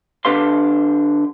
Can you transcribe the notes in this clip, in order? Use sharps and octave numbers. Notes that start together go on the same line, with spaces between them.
D3 D4 G4 B4 F5 C6